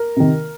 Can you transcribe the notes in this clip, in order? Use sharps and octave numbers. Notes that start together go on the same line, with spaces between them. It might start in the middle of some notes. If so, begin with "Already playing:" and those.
Already playing: A#4
C3 D#3